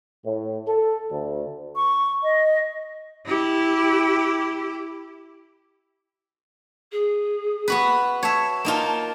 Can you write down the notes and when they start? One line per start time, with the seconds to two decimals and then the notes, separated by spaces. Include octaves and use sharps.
0.25 A2
0.68 A4
1.12 D2
1.76 C#6
2.23 D#5
3.26 E4 G4
6.92 G#4
7.68 B3 F#4 B4
8.23 C#5 E5 A5
8.65 A#3 D#4 F4